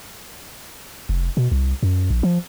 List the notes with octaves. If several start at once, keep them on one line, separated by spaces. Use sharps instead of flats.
F1
B2
C2
F#2
A#1
F3